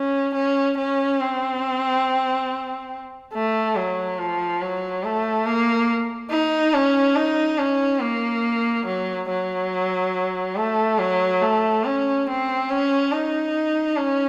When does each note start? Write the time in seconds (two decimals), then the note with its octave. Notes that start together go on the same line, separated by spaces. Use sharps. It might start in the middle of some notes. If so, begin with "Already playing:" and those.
Already playing: C#4
0.35 C#4
0.78 C#4
1.21 C4
3.34 A3
3.76 F#3
4.19 F3
4.62 F#3
5.04 A3
5.46 A#3
6.31 D#4
6.73 C#4
7.16 D#4
7.59 C#4
8.02 A#3
8.86 F#3
9.29 F#3
10.56 A3
10.99 F#3
11.42 A3
11.85 C#4
12.27 C4
12.70 C#4
13.12 D#4
13.97 C#4